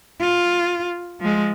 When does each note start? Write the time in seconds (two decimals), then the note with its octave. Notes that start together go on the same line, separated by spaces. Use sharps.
0.20 F4
1.20 F3 G#3